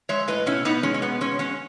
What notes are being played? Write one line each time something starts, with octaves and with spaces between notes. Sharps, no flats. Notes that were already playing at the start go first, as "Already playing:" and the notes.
G#3 C#5 E5
A2 B4 D#5
B2 C#4 E4
B2 B3 D#4
G#3 C#4
C#4
B2 B3
G#3 C#4
G#3 C#4